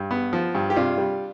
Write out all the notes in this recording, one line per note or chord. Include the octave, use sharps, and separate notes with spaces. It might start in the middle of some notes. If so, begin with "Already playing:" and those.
Already playing: G2
B3
F3
G2
G4
C3 D4 F4
G3